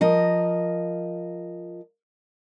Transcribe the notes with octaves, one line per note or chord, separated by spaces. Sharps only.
F3 A#4 D#5